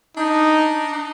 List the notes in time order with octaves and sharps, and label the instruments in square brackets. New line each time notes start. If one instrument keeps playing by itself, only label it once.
[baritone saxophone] D4 [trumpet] D#4
[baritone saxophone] D#4